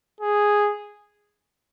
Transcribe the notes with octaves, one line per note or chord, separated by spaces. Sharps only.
G#4